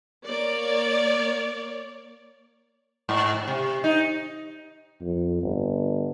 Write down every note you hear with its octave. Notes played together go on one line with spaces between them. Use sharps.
A#3 C#5 D5
G#2
C3
D#4
F2
G1